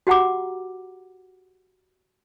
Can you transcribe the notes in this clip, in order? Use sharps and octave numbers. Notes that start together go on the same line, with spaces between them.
F#4 G4 F#5 A#5 D6